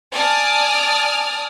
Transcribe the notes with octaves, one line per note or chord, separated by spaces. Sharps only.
D5 G#5 A5 D#6 F6